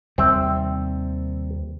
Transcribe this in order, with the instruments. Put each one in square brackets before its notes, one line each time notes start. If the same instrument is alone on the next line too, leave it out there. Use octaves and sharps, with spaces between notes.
[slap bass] D#2 C3 G3 [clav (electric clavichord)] C4 E5